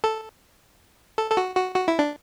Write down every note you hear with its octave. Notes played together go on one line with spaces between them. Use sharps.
A4
A4
A4
F#4
F#4
F#4
E4
D4